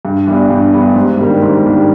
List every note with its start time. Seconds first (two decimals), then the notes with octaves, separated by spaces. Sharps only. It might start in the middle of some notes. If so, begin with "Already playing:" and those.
0.05 G2
0.27 E3 G3 B3 D4
0.51 G2
0.73 E3 G3 B3 D4
0.96 G#2
1.19 D#3 G3 A#3 D4
1.42 G#2
1.65 D#3 G3 A#3 D4